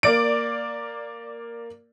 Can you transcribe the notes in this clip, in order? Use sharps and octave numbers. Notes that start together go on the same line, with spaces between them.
A#3 D5 D7